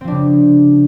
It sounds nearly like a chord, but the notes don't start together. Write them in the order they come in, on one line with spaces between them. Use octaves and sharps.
C4 F3 D4 C#3 G3